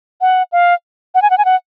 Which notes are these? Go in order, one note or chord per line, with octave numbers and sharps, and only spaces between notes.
F#5
F5
F#5
G#5
F#5
G#5
F#5